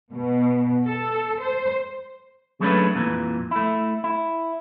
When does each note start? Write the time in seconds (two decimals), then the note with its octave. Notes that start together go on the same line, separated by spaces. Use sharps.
0.12 B2
0.87 A4
1.40 C5
2.60 F#3 G#3 A3 C#4 D4 B4
2.95 F2 A#2 D#3 E3
3.51 A3 E4
4.04 E4